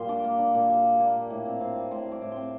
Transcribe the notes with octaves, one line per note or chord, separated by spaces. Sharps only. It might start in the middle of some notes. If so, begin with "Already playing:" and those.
Already playing: A#2 G3 F5 C6
D4 D6
A#3
D4
A#2
G3
G3
A#3
A#2
A2
C4
C4
G3
A2 C6
G3
D6
A2
C6
C4